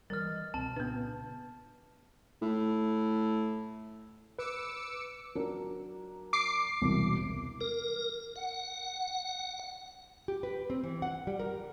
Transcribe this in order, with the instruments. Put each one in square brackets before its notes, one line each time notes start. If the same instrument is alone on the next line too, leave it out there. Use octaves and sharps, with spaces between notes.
[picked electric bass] E3 F#3 G3 [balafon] A#4 [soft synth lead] D#5 [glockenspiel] F6 A6
[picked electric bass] C2 B2 [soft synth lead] C4 [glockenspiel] A5
[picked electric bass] A#2 C#3 [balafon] B3 D4 [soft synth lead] B4
[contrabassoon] A2
[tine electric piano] B4 [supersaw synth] D6 E6 C#7
[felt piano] F#3 D4 A#4
[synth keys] D6 C7
[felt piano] E1 C2 B2
[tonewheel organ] A#4
F#5
[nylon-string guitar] G4
B4
C4
E3
F#5
G3
A#4